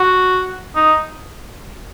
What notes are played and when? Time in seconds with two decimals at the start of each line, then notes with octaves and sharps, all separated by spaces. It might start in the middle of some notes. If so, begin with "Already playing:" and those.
Already playing: F#4
0.75 D#4